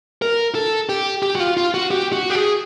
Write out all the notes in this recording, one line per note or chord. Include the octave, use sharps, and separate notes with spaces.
A#4
A4
G4
G4
F#4
F4
F4
F#4
G4
F#4
G4
G#4